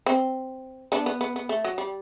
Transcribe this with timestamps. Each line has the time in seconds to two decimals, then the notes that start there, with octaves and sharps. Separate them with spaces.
0.06 C4
0.92 B3 D4
1.06 B3
1.21 B3
1.36 B3
1.49 A3
1.65 F#3
1.78 G3